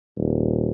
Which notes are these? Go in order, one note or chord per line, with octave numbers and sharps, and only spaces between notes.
D#1